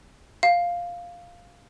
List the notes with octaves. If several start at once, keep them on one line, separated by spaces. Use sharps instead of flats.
F5